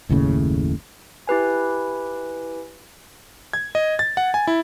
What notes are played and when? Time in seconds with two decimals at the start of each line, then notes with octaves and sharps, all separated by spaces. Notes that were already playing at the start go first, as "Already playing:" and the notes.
0.09 F#1 D#2 A2 C#3
1.27 E4 G4 B4 G#5
3.53 G#6
3.75 D#5
3.99 A6
4.17 F#5
4.34 G#5
4.47 E4